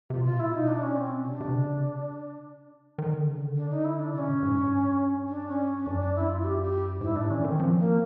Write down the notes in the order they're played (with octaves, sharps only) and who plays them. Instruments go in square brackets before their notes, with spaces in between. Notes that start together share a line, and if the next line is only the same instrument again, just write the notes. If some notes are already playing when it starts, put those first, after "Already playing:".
[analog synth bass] C3 [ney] F4
[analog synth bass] B2 [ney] F4
[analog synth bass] A#2
[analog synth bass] B2 [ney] E4
[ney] D#4
D4
C#4
C4
[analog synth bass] C3 [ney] D4
[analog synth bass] C3
C#3
D#3
D3
C#3
D3
[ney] D4
D#4
E4
D4
[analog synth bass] C3 [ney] D4
[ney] C#4
[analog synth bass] A2
G#2
G2
[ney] D4
C#4
C#4
[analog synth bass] F#2 [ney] D4
[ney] D4
E4
F4
G4
G4
[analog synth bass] G#2 [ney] E4
[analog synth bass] A2 [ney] D4
[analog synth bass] D#3 [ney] C#4
[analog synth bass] D#3 [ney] C4
[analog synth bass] F3
[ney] A#3